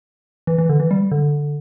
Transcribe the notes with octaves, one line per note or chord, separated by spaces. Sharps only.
E3
E3
D3
E3
G3
D3